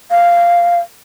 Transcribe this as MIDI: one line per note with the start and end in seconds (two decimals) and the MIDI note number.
0.11 0.79 77